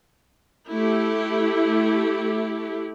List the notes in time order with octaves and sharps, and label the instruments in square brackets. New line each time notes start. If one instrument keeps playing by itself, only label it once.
[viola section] A3 E4 G4